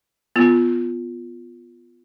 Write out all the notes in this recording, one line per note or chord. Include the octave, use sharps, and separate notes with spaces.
B3 F4